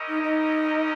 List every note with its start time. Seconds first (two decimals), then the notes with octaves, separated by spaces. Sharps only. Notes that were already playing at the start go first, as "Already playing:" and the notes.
Already playing: C#4 E4 G4 A#4 D#5
0.08 D#4
0.23 D#4